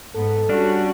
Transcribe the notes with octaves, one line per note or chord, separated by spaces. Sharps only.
G#2 B3 A4
G3 C#4 D4 F#4